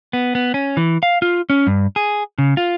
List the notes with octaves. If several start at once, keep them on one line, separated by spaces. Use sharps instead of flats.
B3
B3
C#4
E3
F5
F4
C#4
G2
G#4
C#3
F4